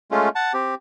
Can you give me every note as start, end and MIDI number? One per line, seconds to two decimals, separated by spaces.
0.11 0.29 56
0.11 0.29 57
0.11 0.29 61
0.11 0.29 65
0.35 0.53 78
0.35 0.53 81
0.53 0.75 60
0.53 0.75 67